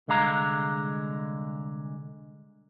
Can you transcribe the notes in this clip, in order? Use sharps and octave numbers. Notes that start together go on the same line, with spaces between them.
C2 D3 G#3 F5 A#5